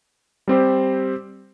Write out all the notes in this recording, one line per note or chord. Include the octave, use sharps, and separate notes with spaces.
G3 C4 G4 C5